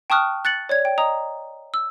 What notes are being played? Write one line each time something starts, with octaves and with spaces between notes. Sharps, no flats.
G5 A5 C#6 D#6 F6 F#6
F#6 A6 C#7 F#7
C#5 D5 G#6
G5
D#5 A#5 D#6
E6